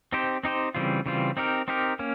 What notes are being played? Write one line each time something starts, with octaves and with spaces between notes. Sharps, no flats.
C4 D#4 G4 C5
C4 D#4 G4 C5
C#3 E3 G3 C4 F4
C#3 E3 G3 C4 F4
C4 D#4 G4 A#4
C4 D#4 G4 A#4
A#3 C#4